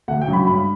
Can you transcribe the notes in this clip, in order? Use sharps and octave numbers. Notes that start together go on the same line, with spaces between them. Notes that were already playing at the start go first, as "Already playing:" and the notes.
D2 F#5
G5
C#3 F#3
B5
G2 B5